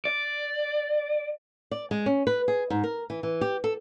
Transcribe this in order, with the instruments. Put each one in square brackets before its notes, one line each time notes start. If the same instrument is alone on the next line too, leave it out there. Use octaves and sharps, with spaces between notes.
[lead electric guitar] D5
[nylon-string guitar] D5
G#3
C#4
B4
G#4
G#2
A#4
E3
E3
G4
A4